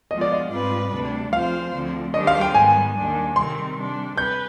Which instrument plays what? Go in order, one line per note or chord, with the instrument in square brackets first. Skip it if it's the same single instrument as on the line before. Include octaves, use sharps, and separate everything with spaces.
[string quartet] F3 G#3 B3 F4 [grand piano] D#5
[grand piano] D5
D#5
[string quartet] G#2 G3 C4 F4 B4
D2 C3 G3 D4
[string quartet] F3 C4 F4 C5 [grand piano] F5
[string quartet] D2 D3 F3 C4
[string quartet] D#3 G3 D4 G4 C5 [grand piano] D#5
[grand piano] F5
G5
[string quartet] G#2 D#3 G3 B3 [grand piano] G#5
[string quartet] D#2 D#3 G3 D4
[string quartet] C3 D#3 G3 C4 [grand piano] C6
[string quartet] C3 G3 D4
[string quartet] B4 [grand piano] G6